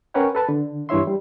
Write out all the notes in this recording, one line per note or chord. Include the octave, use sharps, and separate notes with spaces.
C#4 A#4 B4 C#5 F#5 G5
A4 B4 A5
D3
G2 E3 E4 C#5 E5 C6
G3